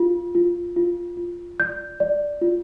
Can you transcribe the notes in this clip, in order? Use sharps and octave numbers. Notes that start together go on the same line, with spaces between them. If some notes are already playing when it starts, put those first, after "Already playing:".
Already playing: F4
F4
F4
F4
D5 G6
D5
F4